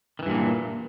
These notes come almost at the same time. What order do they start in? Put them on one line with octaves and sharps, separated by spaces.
D#3 E3 G2 A#2